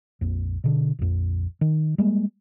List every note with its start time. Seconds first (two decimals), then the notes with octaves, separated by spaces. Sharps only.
0.21 A#1 F2
0.64 B2 D3
0.99 A#1 F2
1.61 D#3
1.98 G3 G#3 A#3